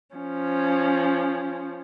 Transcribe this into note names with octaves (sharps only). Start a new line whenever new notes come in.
F3 C#4